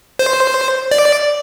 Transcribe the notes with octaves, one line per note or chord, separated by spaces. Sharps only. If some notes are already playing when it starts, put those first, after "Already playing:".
C5
D5